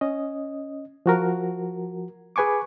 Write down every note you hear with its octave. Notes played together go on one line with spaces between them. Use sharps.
C#4 D#5
F3 F#4 A#4
G#4 B4 G#5 C#6 D6